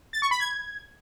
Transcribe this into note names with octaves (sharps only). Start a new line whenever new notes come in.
A6
C#6
B5
G#6